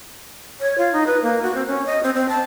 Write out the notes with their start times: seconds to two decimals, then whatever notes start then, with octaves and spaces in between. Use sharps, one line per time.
0.61 C#5
0.78 F4
0.93 D#4
1.07 B4
1.22 A#3
1.42 F#4
1.55 C4
1.67 C#4
1.86 D#5
2.03 C4
2.15 C4
2.29 A5